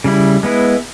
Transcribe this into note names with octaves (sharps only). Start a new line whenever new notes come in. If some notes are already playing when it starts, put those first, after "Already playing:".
C#3 G3 E4
G#3 B3 E4